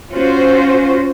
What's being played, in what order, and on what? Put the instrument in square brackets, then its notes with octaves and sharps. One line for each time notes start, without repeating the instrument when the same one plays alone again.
[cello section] C#4 F4 F#4 C5